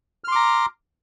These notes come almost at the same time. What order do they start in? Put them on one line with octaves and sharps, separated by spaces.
F6 C6 D6 A#5